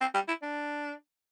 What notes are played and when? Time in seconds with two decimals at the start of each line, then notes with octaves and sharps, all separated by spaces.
0.01 C4
0.14 G3
0.28 E4
0.43 D4